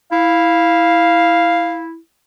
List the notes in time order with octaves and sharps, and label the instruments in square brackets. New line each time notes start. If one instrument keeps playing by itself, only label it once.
[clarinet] E4 [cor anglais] F5